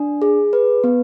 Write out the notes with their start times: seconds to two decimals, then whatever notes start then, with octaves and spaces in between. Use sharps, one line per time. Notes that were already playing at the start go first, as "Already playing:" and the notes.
Already playing: D4
0.22 G#4
0.53 B4
0.84 B3